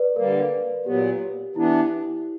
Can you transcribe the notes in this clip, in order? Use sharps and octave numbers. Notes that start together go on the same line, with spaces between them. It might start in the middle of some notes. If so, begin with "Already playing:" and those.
Already playing: B4 D5
D3 G3 A#3 A#4
A#2 F#3 B3 G4
E3 B3 D4 E4